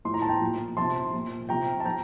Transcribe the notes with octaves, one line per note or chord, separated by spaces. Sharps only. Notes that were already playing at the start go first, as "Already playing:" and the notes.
A2 F3 C6
A#5
A5
G5 A#5
A#2 F3
C3 F3 A5 C6
A#2 F3
C3 F3 G5 A#5
A5
F3 G5 A#5